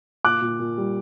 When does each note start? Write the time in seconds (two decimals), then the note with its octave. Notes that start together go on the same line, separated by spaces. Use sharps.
0.24 A#2 D6 F#6
0.42 A#2
0.59 A#2
0.78 G3